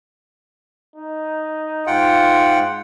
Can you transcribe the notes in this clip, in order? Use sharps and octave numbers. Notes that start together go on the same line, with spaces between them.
D#4
G#2 F4 F#5 G5